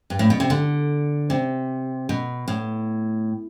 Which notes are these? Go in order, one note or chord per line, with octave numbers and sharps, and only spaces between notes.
G2
A2
B2
C3
D3
C3
B2
A2